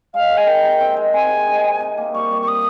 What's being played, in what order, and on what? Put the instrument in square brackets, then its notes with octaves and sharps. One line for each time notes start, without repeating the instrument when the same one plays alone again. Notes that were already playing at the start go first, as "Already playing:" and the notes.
[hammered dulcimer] G#3 [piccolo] F5
[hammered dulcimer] D#3
[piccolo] G#5
[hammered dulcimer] D#4 [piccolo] G5
[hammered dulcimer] C3
C4
G#3
[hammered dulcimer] C4 [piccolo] G#5
[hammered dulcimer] C3
D#4
D#4
C3
A#3
[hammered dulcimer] G3 [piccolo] C#6
[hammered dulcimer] G3
[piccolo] C#6
[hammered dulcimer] C4 [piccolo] D#6